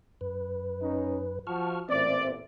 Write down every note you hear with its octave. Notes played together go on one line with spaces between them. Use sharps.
F#2 B4
C#4 D#4
F3 F4 F#4 A5 C#6 F6
A1 A#2 C4 C5 D5 E5